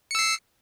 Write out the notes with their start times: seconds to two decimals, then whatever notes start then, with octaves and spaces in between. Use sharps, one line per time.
0.11 C#7
0.15 E6
0.19 C7